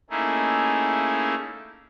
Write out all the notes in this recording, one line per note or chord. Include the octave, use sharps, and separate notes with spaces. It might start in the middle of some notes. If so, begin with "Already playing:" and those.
A3 A#3 C#4 D#4 E4 G#4